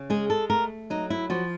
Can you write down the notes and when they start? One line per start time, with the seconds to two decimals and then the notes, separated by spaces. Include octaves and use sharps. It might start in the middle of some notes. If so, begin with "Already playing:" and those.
Already playing: C#3
0.10 G#3 G#4
0.30 A4
0.50 A3 A#4
0.90 F#3 D#4
1.10 E4
1.30 F3 F#4